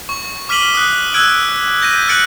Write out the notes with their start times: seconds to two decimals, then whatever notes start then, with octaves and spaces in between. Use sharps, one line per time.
0.09 C#6
0.49 D6 F6 B6 D#7 F#7 G7
0.74 D#6 F#6
1.14 E6 F#6 G#6 D7 F#7
1.82 G6 A#6 B6 D#7
2.08 F6 F#6 A6 C#7 D7 F#7